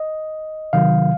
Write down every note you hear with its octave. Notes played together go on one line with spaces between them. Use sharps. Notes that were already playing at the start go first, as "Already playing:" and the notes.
Already playing: D#5
C3 D#3 F#3 F5